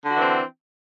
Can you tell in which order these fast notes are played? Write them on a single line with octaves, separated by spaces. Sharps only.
D3 F#4 D4 E3 C4